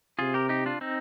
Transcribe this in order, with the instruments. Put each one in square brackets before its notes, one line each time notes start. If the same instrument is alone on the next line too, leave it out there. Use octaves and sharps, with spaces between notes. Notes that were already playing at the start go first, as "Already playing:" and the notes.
[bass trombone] C3 [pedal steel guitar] F4 G#4
[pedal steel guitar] G4 A#4
D#4 G4
D4 F4
C4 D#4